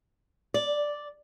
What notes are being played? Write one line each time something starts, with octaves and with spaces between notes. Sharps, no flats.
D5